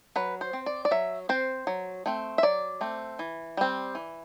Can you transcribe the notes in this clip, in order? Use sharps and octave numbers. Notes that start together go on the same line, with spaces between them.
F#3 B4
C5
C4
D5
D5
F#3 E5
C4 C5
F#3
A3 C4
E5
F#3 D5
A3 C4
E3
G3 C4
E3